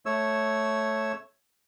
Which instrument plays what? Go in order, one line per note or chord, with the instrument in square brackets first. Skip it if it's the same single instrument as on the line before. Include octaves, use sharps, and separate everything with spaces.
[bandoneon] A3 C#5 E6